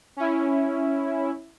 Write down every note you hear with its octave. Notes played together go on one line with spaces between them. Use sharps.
C#4 E4